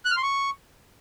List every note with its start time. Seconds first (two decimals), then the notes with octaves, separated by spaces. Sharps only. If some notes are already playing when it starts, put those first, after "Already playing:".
0.05 F#6
0.11 F6
0.17 C6
0.23 C#6